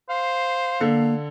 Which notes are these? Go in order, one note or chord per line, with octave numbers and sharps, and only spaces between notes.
C5 F5
D3 A#3 A4